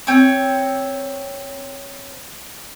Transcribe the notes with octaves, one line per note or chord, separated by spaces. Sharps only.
C4 C#5